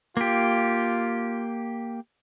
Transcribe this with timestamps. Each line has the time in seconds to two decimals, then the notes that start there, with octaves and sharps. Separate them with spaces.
0.17 A#3 F4 G4